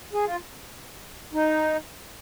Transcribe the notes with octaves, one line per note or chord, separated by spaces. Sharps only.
G#4
F4
D#4